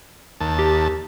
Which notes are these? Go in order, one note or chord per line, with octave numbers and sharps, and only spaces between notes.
D#2 A5
G4